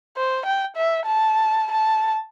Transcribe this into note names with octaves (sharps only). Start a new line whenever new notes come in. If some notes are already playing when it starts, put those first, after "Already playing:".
C5
G5
E5
A5
A5